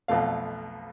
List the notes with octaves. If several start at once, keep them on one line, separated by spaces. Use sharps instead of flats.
B1 F2 B2 A3 F5